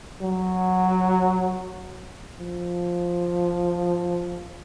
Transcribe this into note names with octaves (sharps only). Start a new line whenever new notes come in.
F#3
F3